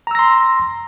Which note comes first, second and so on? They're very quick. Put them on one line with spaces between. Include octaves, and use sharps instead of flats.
A#5 E6 A#6 C6